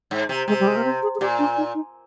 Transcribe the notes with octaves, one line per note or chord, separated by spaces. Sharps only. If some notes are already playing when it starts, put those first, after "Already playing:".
G#2
C3
C3 G#3
G3
G#3
A#3
C4
G#4
G#4
A#2 G4
D4
D#4
D#4